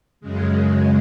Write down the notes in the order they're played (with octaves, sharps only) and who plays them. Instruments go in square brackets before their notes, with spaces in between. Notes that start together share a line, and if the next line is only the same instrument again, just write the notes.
[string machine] F#2 C#3 G#3